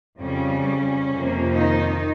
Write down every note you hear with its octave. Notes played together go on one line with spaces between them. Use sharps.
F2 C#3 G3 C#4
F2 C3 F3 A#3
D#3 D#4